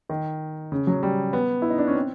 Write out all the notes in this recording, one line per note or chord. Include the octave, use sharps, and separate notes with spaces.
D#3
C#3
F#3
G3
B3
E4
D#4
D4
C#4
C4